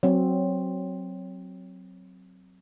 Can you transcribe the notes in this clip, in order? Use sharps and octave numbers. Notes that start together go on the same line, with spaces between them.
F#3 C4